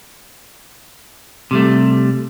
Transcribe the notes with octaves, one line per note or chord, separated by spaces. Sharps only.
C3 G3 A3